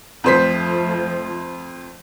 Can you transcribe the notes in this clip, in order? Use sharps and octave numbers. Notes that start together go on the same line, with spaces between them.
F2 F3 A3 C5 B6